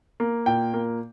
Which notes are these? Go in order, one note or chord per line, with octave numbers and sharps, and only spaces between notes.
A#3
A#2 G5
A#3